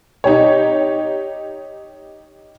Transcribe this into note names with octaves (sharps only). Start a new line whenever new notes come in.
D#4 G4 C#5